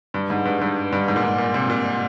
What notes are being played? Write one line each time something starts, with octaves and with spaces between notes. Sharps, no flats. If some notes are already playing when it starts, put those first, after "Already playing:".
G2
G#2
G2
G2
G2
G#2
A#2
G#2
A#2
C3
A#2